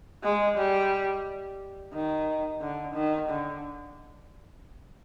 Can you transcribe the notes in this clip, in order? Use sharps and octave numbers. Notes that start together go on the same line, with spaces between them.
G#3
G3
D#3
D3
D#3
D3